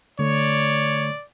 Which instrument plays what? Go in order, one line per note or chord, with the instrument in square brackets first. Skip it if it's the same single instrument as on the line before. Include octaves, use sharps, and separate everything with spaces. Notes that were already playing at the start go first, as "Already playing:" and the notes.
[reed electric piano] D3 A3 [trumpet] C#5 [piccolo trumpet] D5